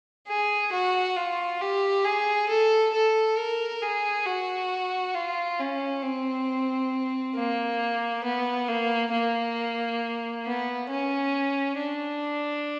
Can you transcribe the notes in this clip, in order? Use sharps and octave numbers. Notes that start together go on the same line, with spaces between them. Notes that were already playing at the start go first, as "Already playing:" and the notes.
G#4
F#4
F4
G4
G#4
A4
A4
A#4
G#4
F#4
F4
C#4
C4
A#3
B3
A#3
A#3
B3
C#4
D4